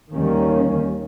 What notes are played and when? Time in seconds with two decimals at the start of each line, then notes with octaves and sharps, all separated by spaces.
0.12 D#2 D#3 G3 A#3 C#4